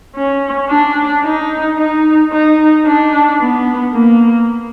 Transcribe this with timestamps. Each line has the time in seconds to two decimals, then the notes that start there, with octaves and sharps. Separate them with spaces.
0.15 C#4
0.70 D4
1.24 D#4
1.77 D#4
2.32 D#4
2.87 D4
3.40 B3
3.94 A#3